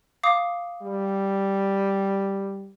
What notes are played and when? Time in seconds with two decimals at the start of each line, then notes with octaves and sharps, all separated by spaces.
0.23 F5 D6 D#6
0.82 G3